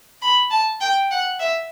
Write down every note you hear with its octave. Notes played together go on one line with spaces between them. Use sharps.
B5
A5
G5
F#5
E5